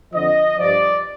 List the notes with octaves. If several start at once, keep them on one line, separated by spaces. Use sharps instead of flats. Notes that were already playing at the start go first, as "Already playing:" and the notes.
F2 D3 F3 D#5
G2 F3 D5